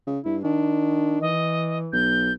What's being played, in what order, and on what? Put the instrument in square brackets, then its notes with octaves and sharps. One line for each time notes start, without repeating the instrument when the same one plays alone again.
[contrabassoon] C#3
[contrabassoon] G2 [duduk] E4
[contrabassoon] D#3 [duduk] D4
[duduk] E3 [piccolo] D#5
[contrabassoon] B1 [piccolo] G6